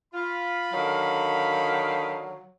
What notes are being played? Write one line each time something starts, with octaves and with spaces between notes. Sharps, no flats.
F4 B5
D3 D#3 F#3 F5